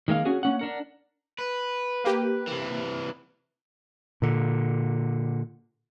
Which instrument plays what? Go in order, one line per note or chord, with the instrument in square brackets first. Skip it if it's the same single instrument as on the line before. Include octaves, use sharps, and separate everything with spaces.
[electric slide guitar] D#3 G#3 A#3 F5
C#4 F#4 G#4
A#3 C#4 F#5
D4 A#4 F#5
[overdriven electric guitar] B4
[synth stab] A#3 G4
[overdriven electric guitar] C3 E3
[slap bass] A#2 D3